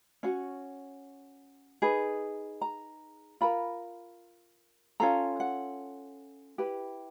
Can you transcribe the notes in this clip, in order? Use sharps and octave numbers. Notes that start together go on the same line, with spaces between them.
C#4 F#4
D#4 G#4 B4
A#5
F4 A#4 B5
C#4 F4 A4 A#5
F#5
E4 G4 B4